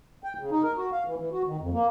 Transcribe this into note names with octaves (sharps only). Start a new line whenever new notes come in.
G5
C#3
D#4
A#4
F#4
F5
E3
E3
F#4
D#3
F2
A#3